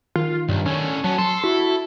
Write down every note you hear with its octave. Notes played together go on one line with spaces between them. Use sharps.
D#3 F4
B1 G2
A2 D3 C#4
F#3 B3 C#4 A5
A4 C6
E4 F#4